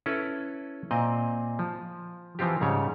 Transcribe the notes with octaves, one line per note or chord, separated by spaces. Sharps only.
C#4 E4 A4 B4 C#5
A#2 C4 D#5
F3
E3 F3 C4 F4 G4
G#2 C#3 G3 C#5